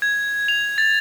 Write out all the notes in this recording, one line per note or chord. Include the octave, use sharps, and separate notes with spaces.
G#6
F7
A6